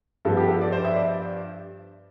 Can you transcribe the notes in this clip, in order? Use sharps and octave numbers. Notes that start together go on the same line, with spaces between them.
G2 F3 B3 A4
G4
A4
D5
C5
E5
D5